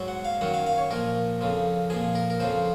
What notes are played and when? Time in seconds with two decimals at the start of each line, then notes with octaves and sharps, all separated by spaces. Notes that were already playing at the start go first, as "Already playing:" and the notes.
Already playing: G#2 F#3
0.08 F#5
0.25 F5
0.41 F#2 D#3 F#3 F#5
0.54 F5
0.66 F5
0.78 C#5
0.91 A#2 F3 A#4
1.41 F2 C#3 F3
1.90 A#2 F3 G#4
2.15 A#4
2.30 A#4
2.40 F2 C#3 F3 C5